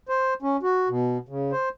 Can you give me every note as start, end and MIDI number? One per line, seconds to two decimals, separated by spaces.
0.09 0.34 72
0.42 0.57 61
0.63 0.88 66
0.89 1.18 47
1.29 1.52 49
1.52 1.69 72